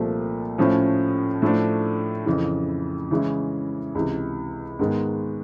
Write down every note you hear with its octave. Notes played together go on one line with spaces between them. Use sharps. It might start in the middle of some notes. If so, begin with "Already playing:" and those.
Already playing: C2 A#2 F3 A3
A2 F3 A3 C#4
A2 F3 A3 D4
F2 C#3 E3
C#3 E3 G#3 C#4 E4
C#2 C3 E3
G#2 D#3 G#3 B3